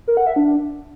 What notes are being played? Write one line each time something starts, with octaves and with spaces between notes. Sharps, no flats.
A#4
F#5
E5
D4